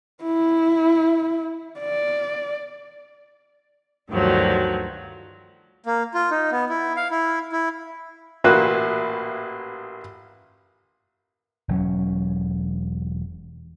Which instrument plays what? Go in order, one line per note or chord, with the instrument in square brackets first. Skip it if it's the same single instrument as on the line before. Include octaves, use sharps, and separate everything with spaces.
[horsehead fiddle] E4
D5
[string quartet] D2 G2 D#3 F3 F#3
[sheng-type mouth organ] A#3
F4
D#4
B3
E4
F5
E4
E4
[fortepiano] A1 A#2 A#3 F#4 B4 E5
[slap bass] E1 F#3 C#4